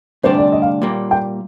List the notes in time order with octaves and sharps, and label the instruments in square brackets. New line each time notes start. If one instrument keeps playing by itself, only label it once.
[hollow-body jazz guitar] D2 C3 G3 D4 [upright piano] C5
[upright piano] D5
D#5
F5
[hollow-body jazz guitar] A#2 G3 A#3
[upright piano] G5